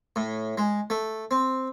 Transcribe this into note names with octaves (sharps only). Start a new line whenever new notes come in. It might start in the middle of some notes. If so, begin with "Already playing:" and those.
A2
G#3
A3
C4